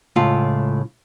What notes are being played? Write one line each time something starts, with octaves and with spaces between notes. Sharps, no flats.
C#2 A2 F4